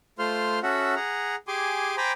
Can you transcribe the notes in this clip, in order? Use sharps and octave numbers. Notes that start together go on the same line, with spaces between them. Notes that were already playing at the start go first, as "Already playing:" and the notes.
A3 F4 C5 C6 F6
C#4 F#4 A4 E5 F#5
G#4 F#5 A#5
G4 G#4 G#5 C6 D6
C5 G5 G#5 A#5 B5 D6